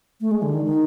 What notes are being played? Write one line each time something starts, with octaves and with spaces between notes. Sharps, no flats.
A3
G#3
D3
D#3
D#3